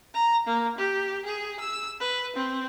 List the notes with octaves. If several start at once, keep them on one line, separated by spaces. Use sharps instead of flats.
A#5
A#3
G4
G#4
E6
B4
C4